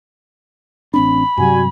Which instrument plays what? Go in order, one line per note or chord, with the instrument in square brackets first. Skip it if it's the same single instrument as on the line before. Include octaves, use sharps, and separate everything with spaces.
[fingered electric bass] A1 C4 D4 [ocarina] B5
[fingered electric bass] G2 C3 F#3 [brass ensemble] G3 F#4 G#5